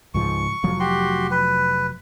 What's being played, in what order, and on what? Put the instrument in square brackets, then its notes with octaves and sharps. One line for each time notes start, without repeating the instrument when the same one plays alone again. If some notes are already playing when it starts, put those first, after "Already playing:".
[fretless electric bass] C#2 G#2 F3 [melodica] C#6
[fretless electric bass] F1 F3 F#3
[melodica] F#4 G4 C6
B4